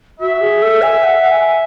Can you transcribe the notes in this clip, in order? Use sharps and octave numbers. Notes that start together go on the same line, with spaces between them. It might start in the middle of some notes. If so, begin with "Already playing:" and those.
F#4 E5
G#4
A4
G#5
F#5
G#5